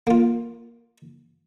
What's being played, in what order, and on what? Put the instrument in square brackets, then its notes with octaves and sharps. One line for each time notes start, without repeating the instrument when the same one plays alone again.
[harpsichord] A#3 F4